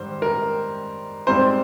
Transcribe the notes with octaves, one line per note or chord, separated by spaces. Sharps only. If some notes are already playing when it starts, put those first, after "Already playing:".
Already playing: G#2 D#3 G3 C5
A#4
G#2 G3 C4 C5